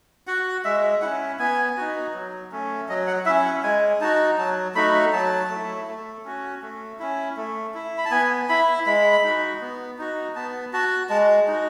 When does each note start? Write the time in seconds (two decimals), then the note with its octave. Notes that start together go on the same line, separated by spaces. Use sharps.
0.27 F#4 F#5
0.65 G#3 E5
1.02 C#4 E4 F#5
1.39 B3 G#5
1.77 D#4 F#4
2.14 F#3
2.52 A3 C#4
2.89 F#3 D#5
3.07 F#5
3.26 C#4 E4 E5
3.45 F#5
3.63 G#3 G#5
4.01 D#4 F#4 A5
4.38 F#3 A5
4.75 A3 D#4 F#4 B5
5.13 F#3 A5
5.50 A3 E4
5.88 A3
6.25 C#4 F#4
6.62 A3
6.99 C#4 E4
7.37 A3
7.74 E4
7.98 B5
8.05 A5
8.11 B3 G#5
8.49 E4 B5
8.86 G#3 B5
9.24 D#4 F#4
9.61 B3
9.99 D#4 F#4
10.36 B3 A5
10.73 F#4 A5
11.10 G#3 A5
11.48 D#4 F#4